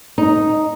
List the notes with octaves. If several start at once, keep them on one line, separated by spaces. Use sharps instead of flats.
D#4